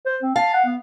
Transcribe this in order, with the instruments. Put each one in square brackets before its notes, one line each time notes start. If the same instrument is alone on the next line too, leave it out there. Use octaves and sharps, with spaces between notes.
[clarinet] C5
C4
[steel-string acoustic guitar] F5 [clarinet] A5
[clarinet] F#5
B3